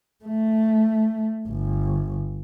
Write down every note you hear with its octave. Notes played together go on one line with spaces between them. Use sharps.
A3
G1